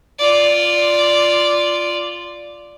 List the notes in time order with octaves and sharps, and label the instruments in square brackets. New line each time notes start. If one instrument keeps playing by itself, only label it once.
[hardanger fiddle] F4 D5